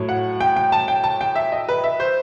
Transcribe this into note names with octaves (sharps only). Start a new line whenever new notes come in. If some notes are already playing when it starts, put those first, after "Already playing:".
Already playing: A2 F#3
F#5
G5
G5
A5
G5
A5
G5
E5
D#5
B4
E5
C5